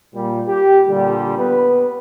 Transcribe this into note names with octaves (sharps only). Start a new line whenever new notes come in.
A#2 G3
G4
A#2 D3 G3
B3 B4